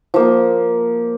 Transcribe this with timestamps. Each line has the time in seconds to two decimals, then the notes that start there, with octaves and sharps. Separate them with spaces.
0.14 F3 A#3